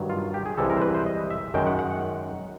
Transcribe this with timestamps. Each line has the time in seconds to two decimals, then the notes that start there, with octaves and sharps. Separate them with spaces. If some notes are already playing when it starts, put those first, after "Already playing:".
Already playing: G2 D#3 F#3
0.10 F4
0.34 G4
0.46 G#4
0.57 C2 C3 E3 G#3 A4
0.70 A#4
0.77 C5
0.82 B4
0.94 C5
1.06 D#5
1.31 E5
1.54 F#2 D#3 G#3 G5
1.67 F#5
1.79 F#5